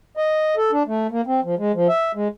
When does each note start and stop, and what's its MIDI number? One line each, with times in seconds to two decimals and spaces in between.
0.17 0.55 75
0.57 0.71 69
0.72 0.83 62
0.87 1.07 57
1.11 1.21 58
1.27 1.41 60
1.44 1.55 53
1.59 1.72 56
1.74 1.88 53
1.89 2.12 76
2.15 2.28 56